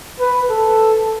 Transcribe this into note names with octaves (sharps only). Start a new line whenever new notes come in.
B4
A4